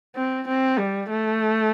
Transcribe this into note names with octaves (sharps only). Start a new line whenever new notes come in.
C4
C4
G3
A3